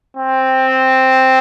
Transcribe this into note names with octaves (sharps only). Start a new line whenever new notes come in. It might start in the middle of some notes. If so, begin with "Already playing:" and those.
C4